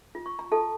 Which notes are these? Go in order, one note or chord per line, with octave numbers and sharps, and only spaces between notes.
F4
C#6
A#5
F4 A4 A5